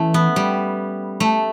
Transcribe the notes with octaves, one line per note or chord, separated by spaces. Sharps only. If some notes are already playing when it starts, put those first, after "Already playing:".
Already playing: E3 A3 C#4
B3
G3
A3